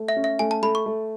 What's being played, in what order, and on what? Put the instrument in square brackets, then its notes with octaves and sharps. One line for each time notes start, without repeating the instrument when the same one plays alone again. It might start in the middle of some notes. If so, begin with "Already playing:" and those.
Already playing: [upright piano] A3
[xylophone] E5
[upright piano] C#4
[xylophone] E5
[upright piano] A3 [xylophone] G#5
[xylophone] A5
[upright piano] A3 [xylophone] B5
[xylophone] C#6
[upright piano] A3